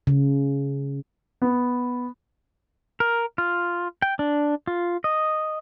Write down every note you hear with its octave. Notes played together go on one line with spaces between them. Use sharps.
C#3
B3
A#4
F4
G5
D4
F4
D#5